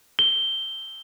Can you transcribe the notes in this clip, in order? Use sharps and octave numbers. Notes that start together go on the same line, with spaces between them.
G7